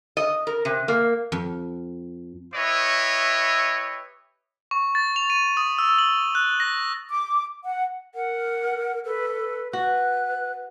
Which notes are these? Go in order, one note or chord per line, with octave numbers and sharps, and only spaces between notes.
D#5
A#4
C3
A#3
F2
E4 G4 B4 C#5 D#5 E5
C#6
A6
F7
D#7
D#6
E6
F#7
F#6
A#6
D6
F#5
A#4 F#5
A4 B4
B4
F#4 B4 F#6